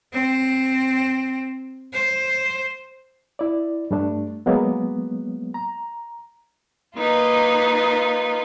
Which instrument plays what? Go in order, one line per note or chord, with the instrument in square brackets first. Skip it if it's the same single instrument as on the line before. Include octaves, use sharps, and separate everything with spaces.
[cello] C4
C5
[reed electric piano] E4 D5
G2 G3 A3 D4
F#3 G#3 A#3 B3
A#5
[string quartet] A#3 D#4 F4 B4